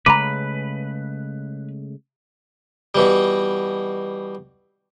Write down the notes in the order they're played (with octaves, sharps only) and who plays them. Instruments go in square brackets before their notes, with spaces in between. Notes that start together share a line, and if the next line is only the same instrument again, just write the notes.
[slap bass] C#3 G#3 A3 [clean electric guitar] B4 [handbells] A#5 B5 D6
[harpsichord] B2 E3 G3